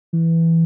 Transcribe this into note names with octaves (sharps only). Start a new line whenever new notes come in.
E3